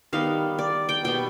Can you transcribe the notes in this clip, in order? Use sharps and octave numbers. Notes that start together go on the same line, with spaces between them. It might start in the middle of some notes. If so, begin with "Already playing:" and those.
D#3 G3 B3 F5
D5
G5
B2 G3 B3 G5